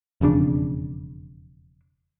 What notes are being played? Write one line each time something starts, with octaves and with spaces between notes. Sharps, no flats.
E1 F2 C#3 D4